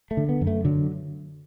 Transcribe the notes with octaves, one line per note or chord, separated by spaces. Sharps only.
A3
D3
B3
F#2
A3
D3 F#3